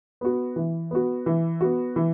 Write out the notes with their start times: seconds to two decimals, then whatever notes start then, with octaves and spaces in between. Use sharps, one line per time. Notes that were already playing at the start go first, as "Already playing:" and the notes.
0.21 B3 F#4
0.56 E3
0.91 B3 F#4
1.26 E3
1.61 B3 F#4
1.96 E3